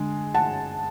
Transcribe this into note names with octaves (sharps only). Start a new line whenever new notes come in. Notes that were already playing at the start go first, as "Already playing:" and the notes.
Already playing: D3 G#3
F#5 A5